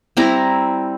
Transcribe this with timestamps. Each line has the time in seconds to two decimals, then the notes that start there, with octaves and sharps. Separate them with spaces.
0.17 G3 C4 E4 A#5